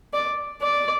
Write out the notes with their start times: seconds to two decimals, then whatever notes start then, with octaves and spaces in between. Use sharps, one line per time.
0.14 D5
0.61 D5